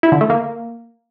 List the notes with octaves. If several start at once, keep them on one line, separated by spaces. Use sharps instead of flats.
E4
D3
A3
A#3